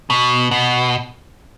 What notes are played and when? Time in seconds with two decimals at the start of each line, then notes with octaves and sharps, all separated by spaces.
0.10 B2
0.51 B2